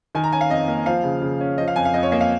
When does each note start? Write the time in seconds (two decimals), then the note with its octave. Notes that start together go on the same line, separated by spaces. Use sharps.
0.15 D#3 G#5
0.24 A#5
0.33 C#4 G#5
0.41 F5
0.50 F2 D#5
0.68 A#3
0.86 F3 F5
1.04 C#3
1.22 C#3
1.41 C#4
1.58 F3 D#5
1.68 F5
1.76 F2 G#5
1.85 F5
1.94 F2 D#5
2.03 C#5
2.12 A#3 D#5
2.21 F5